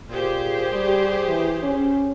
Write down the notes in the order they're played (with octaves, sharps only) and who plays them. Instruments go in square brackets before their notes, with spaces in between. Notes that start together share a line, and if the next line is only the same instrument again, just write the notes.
[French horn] A#2 [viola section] G4 G#4 C5
[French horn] G3
E3
C#4